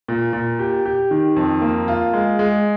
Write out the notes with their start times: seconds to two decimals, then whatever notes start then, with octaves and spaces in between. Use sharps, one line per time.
0.08 A#2
0.33 A#2
0.59 G4
0.85 G4
1.11 D#3
1.36 F2
1.62 A#3
1.88 F4
2.13 G#3
2.39 G#3